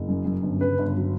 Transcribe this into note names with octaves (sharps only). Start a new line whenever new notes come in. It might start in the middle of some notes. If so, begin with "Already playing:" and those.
Already playing: F#1
F#2
F#2
G1
C#3 B4
G1
F#3